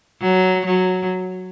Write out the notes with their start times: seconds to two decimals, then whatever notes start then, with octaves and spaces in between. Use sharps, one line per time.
0.21 F#3
0.66 F#3